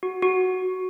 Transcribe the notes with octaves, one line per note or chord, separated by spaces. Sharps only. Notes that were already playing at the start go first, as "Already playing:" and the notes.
F#4
F#4